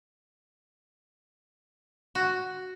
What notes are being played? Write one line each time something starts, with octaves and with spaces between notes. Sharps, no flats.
F#4